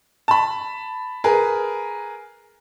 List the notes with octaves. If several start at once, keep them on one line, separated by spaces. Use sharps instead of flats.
A5 B5
G#4 A#4 B4